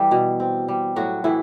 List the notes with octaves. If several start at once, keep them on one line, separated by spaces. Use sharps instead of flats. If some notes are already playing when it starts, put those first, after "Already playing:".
Already playing: E3 G3 G4 A4
B2
C4
G3
A2 F#3 F#4
A2 E3 E4